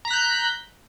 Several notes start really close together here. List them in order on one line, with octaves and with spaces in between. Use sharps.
A#5 B6 F#6 G6